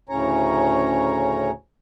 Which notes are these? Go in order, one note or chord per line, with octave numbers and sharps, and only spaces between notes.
D2 A2 C#3 C#4 C#5 A#5